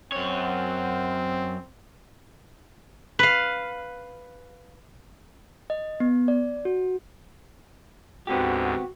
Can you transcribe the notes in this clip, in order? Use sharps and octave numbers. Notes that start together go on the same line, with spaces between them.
F#2 C4 C#5
B4 F5
D#5
B3
D5
F#4
D2 G#2 D3 B3 C4 F#4 G4